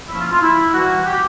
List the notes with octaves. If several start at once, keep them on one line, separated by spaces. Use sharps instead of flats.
F3 A#3 C#4 E4
F4
F4
E4
E3 G3 A#3 F#4
G4